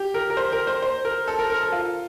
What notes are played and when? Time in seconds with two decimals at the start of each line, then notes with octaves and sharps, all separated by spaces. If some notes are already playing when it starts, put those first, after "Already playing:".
Already playing: G4
0.14 A#4
0.30 A#4
0.37 C5
0.52 A#4
0.67 C5
0.82 C5
1.05 A#4
1.28 A4
1.39 A#4
1.50 A#4
1.61 A4
1.72 F4